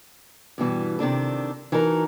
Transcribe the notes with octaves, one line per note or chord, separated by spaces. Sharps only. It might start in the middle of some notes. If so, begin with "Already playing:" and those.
G2 B2 E3 G3
C3 D#3 D4 A4
E3 D#4 F#4 A4 A#4